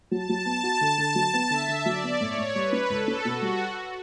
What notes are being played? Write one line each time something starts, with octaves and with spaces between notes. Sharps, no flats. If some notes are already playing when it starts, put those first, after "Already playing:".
F#3 A5
F#3
B3
F#4
D3
D3
F#3
B3
D3 E5
D3
F#3 D5
B3
A2 C#5
A2
G3 B4
C#4
C#2 A4
C#4
B2 F#4
G3